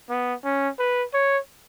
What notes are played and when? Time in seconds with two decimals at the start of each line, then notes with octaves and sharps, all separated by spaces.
0.10 B3
0.45 C#4
0.79 B4
1.14 C#5